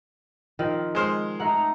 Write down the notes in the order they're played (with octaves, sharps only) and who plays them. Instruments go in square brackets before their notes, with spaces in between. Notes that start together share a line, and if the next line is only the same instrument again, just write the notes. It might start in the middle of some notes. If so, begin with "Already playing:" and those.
[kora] D#3 F3 C4
[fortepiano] G#3 C5 F6
[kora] A3 F#5 [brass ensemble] D#4 A#5